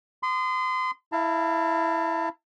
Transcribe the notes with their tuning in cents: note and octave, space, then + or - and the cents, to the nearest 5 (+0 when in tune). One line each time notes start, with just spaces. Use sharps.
C6 -35 D#6 -35
E4 +0 F5 -25 A5 +35